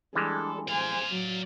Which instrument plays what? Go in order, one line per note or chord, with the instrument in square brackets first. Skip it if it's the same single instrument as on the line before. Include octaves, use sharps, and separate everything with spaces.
[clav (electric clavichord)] E3 G3 G#3 [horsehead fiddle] D4 A4
[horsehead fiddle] C5 G#5 [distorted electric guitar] D5 F5
[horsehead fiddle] F#3